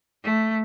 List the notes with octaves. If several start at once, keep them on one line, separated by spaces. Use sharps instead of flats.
A3